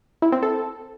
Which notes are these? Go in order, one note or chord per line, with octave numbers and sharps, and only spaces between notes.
E4
C4
A4